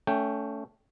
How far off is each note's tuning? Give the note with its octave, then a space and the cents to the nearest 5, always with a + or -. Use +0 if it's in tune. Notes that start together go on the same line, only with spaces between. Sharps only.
A3 +0 C#4 +20 G5 +0